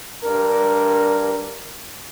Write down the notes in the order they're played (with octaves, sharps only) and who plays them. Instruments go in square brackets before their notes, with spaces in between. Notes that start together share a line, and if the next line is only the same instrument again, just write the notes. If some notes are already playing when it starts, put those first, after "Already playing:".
[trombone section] G2 D4 A#4